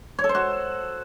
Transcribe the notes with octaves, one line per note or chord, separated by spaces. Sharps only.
C#5
A4
C5
F#4